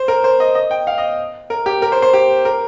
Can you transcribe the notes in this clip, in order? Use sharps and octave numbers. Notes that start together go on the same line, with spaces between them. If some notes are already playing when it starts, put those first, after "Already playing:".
Already playing: C5
A#4
C5
D#5
D#5
G5
F5
D#5
A#4
G4
A#4
C5
C5
G4
A#4